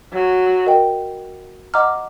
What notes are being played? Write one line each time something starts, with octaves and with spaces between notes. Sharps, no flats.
F#3
A#4 D#5 G5
D#5 F#5 A#5 D6 F6